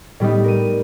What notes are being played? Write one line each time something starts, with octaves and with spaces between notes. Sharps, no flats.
A2 G3 B3 D#4
A#4 D#7